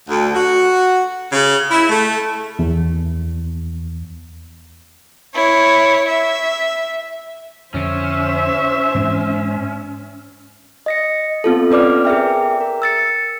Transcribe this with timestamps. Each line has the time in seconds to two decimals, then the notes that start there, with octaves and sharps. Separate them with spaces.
0.08 D2
0.35 F#4
1.32 C#3
1.71 E4
1.89 A3
2.59 E2
5.35 E4 C#5
6.09 E5
7.74 F2 D3 C#4 C5 E5
8.95 G#2 E3 C4
10.86 D#5 A#6 C#7
11.44 B3 C4 F4 A4
11.71 C#4 B4 D5 D6 F6
12.05 G#4 A#4 E5 G5
12.61 A#4
12.82 E6 A6 C#7